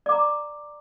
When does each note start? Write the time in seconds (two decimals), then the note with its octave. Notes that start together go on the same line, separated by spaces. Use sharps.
0.06 D5
0.09 D6
0.12 A#5